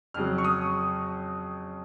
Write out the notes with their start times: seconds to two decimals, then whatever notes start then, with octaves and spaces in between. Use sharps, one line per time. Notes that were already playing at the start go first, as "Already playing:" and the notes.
0.14 F2 C#3 F#3 F6
0.38 C#6
0.45 D#6